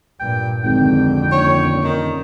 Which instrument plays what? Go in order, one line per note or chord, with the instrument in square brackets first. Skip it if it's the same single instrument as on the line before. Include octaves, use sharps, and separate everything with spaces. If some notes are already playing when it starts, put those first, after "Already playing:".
[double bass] G2 A#2 [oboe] G5
[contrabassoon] G#1 [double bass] F2 D3 [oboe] G5
[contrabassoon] D#1 [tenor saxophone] C#5
[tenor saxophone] D#3